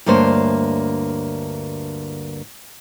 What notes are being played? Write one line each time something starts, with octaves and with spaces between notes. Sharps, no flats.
D2 G2 A#3 D4 C5 C#5